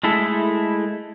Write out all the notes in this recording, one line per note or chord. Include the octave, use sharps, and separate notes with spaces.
G#3 A3 E4 A4